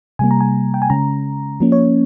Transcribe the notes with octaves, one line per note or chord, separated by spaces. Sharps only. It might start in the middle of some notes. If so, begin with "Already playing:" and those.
C3 G3 A#3 G#5
A#5
G#5
G5
G#5
C#3 G#3 C#4 A#5
F3 A#3 C#4
C#5